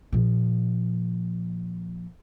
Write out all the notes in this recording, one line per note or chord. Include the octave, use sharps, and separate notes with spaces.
A#2 F3